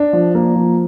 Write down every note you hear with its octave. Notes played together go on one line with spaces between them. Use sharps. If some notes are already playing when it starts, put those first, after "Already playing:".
Already playing: D4
F3
A#3
F3